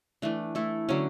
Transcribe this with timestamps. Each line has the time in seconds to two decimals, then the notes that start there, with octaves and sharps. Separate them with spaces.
0.22 E3 A3 D4
0.55 A3 E4 A4
0.89 D3 F#3 C#4